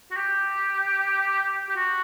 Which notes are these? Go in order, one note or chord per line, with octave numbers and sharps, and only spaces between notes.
F#4
G4
G4
F#4